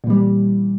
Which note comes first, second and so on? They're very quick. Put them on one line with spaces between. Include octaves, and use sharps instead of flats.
A#2 E3 G3